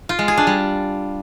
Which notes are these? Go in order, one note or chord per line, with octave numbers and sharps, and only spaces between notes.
F4
G#3
G#4
D4
G3